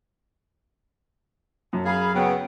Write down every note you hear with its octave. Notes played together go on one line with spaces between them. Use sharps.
F#2 A5
G#4 F5 B5
C#3 F#3 B3 G5